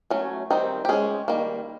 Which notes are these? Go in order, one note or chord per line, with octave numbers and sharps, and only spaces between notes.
F#3 A3 C#4
D#3 G3 C4 D#4
G4
G#3 C#4 G#4
D#3 G3 A#3